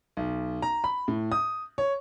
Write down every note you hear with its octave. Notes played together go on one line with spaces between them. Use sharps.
B1
A#5
B5
A2
D#6
C#5